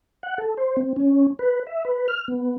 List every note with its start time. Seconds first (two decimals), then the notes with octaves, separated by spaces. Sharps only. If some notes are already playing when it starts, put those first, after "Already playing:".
0.23 F#5
0.38 A4
0.57 C5
0.77 C4
0.96 C#4
1.39 B4
1.67 E5
1.85 B4
2.08 F6
2.28 B3